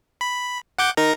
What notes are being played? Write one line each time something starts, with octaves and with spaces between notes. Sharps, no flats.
B5
F#5 D6 G6
D#4 A#4 A#5